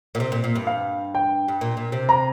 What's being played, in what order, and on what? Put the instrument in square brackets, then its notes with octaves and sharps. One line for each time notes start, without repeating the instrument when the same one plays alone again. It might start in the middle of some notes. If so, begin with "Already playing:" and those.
[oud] A#2
C3
A#2
A#2
G2
[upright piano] F5
G5
[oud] G2
A#2
A#2
C3
[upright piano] A#5